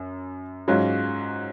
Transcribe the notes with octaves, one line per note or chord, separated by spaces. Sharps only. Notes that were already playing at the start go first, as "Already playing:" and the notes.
Already playing: F#2
G#2 F#3 C#4 F4